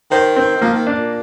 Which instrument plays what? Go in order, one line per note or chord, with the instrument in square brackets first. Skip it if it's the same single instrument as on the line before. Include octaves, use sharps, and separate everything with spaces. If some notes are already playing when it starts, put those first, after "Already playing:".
[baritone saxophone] D#3 [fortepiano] C5
[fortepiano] C4
[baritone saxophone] D#3
[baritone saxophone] F3 [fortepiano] A#3
[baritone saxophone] D#3
[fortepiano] D4
[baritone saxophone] A#2